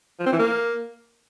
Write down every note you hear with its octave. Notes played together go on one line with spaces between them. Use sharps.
F3
C4
E3
A#3